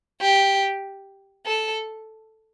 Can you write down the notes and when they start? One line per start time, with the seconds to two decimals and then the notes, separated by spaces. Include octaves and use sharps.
0.21 G4
1.46 A4